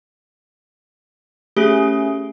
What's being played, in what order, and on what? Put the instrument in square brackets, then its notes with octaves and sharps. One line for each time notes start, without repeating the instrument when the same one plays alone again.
[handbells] A3 C#4 G#4 [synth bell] G4